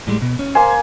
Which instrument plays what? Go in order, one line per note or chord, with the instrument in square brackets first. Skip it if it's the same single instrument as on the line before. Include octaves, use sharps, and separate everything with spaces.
[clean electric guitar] A2 G3 G#3
B2
C#4
[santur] A#3 G#5 [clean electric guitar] C5